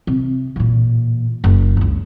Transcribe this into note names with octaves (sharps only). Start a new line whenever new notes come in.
C3
A1 A#2
F#1
C#2 D4